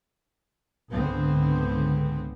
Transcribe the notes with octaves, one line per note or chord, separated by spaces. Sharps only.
C#2 G#2 D3 B3 C4